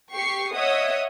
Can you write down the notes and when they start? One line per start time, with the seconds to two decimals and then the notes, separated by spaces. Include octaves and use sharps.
0.14 G4 C#6 C7
0.55 C#5 D#5 E5 F#5 D#6